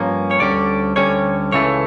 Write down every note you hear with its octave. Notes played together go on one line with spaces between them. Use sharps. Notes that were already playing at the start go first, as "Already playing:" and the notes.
Already playing: G2 F3 A#3 C#4
C#5
D2 D3 G3 C#4 D5
D2 D3 G3 C#4 C#5
C#2 C#3 E3 A3 C#5